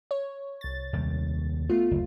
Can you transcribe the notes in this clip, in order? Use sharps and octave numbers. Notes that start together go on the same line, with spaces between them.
C#5
C2 A6
D#2 C3 G3
A3 B3 F4
F#1 D2